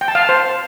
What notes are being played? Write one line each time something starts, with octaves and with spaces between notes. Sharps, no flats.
G5
A5
F5
A5
C5